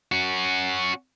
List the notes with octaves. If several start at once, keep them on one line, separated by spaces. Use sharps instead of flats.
C#4 F#4